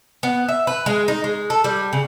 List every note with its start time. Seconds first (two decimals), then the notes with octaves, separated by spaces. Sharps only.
0.23 B3
0.48 E5
0.67 B4
0.86 G#3
1.08 D#4
1.24 G#3
1.50 A4
1.64 G3
1.93 C#3